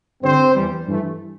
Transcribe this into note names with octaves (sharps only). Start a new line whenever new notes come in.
G2 D3 G3 C4 C5
E2 E3 G3
G2 E3 A3